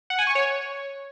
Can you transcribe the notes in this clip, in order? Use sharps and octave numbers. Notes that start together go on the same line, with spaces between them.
F#5
G#5
C#6
C#5